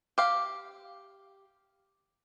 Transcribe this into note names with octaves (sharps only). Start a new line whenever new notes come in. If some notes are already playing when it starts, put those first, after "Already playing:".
G4 F5